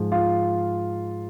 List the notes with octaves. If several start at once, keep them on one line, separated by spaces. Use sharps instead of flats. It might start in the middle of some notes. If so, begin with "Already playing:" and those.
Already playing: G#2 F3 G#3
F4 F5